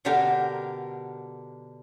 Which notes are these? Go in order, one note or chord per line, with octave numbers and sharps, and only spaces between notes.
B2 D3 D4 G4 A#4